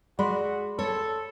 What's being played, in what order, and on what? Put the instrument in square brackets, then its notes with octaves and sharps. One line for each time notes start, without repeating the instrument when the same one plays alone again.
[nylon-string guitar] G#3 [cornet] F#4 [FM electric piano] D5 B5 C6
[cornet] A4 [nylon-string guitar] C#5